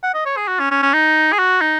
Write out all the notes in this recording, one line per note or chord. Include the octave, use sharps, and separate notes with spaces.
F#5
D#5
C#5
G#4
F#4
C#4
C#4
C#4
D#4
G#4
F#4
D#4